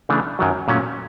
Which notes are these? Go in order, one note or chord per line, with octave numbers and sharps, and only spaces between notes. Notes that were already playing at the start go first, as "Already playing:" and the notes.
C#3 E3 A3 D4
F#2 D#3 F#3
A#2 F#3 A3 C#4